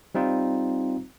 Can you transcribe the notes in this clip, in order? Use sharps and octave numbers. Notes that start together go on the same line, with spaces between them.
G3 C4 D#4 F4